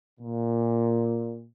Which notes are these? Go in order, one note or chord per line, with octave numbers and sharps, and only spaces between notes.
A#2